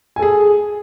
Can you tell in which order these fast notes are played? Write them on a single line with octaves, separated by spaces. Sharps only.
G#5 A4 G#4